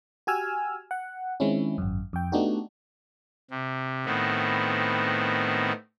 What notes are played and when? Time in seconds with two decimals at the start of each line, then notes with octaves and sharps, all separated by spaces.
0.27 F#4 G4 G#5 E6 F6
0.91 F#5
1.40 D#3 G#3 C4 C#4 E4
1.78 G#1 F#2
2.13 F2 G5
2.32 A3 B3 D4 D#4 F#4 G4
3.50 C3
4.06 A2 D#3 B3 C4